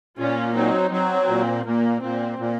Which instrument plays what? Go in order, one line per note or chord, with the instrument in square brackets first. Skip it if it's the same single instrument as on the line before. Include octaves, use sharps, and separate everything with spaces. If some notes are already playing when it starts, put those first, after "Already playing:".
[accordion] A#2 [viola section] C#4 F4
[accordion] F#3 [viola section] C4 D#4
[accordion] F#3 [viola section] C4
[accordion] A#2
[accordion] A#2 [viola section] A#3
[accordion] A#2 [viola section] C4
[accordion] A#2